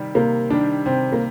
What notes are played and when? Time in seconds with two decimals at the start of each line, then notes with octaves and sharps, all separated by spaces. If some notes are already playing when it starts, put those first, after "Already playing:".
Already playing: C3 D#3 G3
0.15 C3 A#3
0.50 D#3 G3 D4
0.86 C3 C4
1.12 A#3